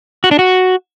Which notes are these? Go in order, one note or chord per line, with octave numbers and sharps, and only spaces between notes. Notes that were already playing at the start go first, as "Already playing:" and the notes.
F#4
D4
F#4